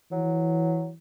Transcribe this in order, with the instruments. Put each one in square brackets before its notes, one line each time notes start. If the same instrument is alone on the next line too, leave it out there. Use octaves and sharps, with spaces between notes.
[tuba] E3 [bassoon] F#3